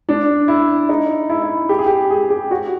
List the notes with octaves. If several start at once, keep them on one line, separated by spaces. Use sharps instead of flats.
D4
E4
D#4
E4
E4
G4
G#4
G4
G#4
G4
F#4